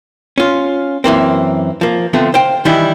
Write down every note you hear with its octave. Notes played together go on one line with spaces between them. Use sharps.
C#4 F4
F#2 E3 A#3 C4
F3 A#3
D3 F3 A3 B3 C4
C5 F5 G5
D#3 E3 G3 E4